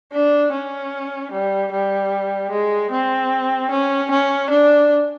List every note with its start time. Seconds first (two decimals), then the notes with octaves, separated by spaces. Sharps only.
0.12 D4
0.52 C#4
1.32 G3
1.72 G3
2.51 G#3
2.91 C4
3.71 C#4
4.10 C#4
4.50 D4